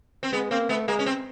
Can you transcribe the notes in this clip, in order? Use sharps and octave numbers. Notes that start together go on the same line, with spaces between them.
C4
G#3 B3
A#3 C4
A3 B3
G#3 A#3
C#4
C4